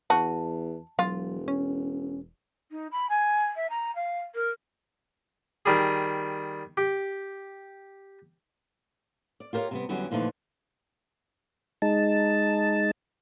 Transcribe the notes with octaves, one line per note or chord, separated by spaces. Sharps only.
E2 F#4 A5
E1 F#3 F4
C#4
D#4
B5
G#5
E5
A#5
F5
A#4
D#3 G3 G#4
G4
D5
F4 G4 A#4 C5 C#5 F5
C3 G3 B3
E2 D3 F#3 G3 C#4
A#2 D3 E3 F3 A3 D#4
G#3 D#4 A5